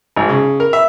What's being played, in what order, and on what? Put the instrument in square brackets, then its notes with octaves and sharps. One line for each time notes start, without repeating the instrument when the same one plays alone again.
[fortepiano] G#1
C#3
A#4
E5